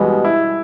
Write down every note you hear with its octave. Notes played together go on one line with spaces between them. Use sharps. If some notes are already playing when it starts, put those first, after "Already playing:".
Already playing: B2 E3 G3 G#3
E4